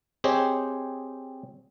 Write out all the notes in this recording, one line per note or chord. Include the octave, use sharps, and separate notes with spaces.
C4 G4 G#4 C5 C#5 D#5